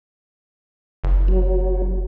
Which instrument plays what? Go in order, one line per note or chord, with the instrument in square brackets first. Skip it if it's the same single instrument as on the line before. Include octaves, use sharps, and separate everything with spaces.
[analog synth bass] F#1
[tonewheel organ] F#3